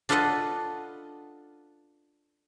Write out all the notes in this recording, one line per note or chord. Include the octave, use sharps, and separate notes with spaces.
D4 F4 A4 B4 D#5 F#5